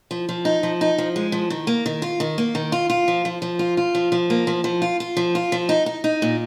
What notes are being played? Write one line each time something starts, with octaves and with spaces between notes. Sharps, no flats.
F3
F3
D#4
F3
D#4
F3
G#3
F3
D#3
A#3
D#3
F4
D#3
A#3
D#3
F4
F4
F3
F3
F3
F4
F4
F3
F3
A#3
F3
F3
F4
F4
F3
F4
F3
D#4
D#4
D#4
A#2